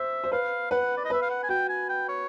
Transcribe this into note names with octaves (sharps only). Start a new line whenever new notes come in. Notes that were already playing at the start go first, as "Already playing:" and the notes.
Already playing: C5 E5
C5
B4 F5
B4 F#5
D5
D#5
B4 E5
F5
F#5
G#5
F#4 G5
G#5
G5
C#5